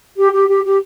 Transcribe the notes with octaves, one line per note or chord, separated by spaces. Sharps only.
G4
G4
G4
G4